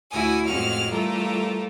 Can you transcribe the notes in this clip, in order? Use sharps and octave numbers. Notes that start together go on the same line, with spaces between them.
D2 E4 F#4 G#5 D#6
F2 A2 G#3 C#4 F#4 F6
E3 G3 A3 F4 A4 A#4